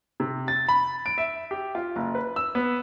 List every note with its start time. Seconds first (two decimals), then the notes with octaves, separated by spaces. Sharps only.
0.20 C3
0.48 A6
0.69 B5
1.06 D7
1.18 E5
1.51 G4
1.75 F4
1.96 F#1
2.15 B4
2.36 E6
2.55 B3